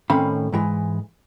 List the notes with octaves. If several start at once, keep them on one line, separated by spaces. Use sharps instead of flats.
A2 D#3 C4 C#4 F5 B5
G#2 E3 G#3